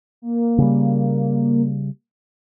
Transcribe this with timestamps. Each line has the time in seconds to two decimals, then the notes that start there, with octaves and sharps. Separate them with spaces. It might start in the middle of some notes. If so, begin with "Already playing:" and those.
0.22 A#3
0.58 C#3 G3